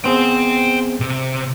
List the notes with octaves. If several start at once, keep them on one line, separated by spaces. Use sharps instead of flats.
B3 C4 G#4 G5 C6
C3